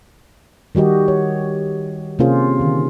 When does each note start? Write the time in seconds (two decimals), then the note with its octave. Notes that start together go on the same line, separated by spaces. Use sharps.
0.75 D#3 G3 F#4 G4 D#5
1.08 C#5
2.19 C3 A#3 C#4 F4 G#4 C5
2.60 D3 D#3